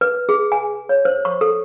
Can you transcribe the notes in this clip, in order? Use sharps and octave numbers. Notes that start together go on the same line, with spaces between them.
B4
G#4
G#5
C#5
C5
C#6
A4